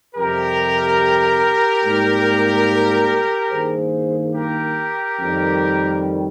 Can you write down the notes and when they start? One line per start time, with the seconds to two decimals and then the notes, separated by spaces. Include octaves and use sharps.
0.15 F2 C3 G3 G4 A#4
1.83 G#2 G3 A#3
3.50 G2 D#3 A#3 G#4 C5
4.34 G4 A#4
5.19 F2 D#3 G3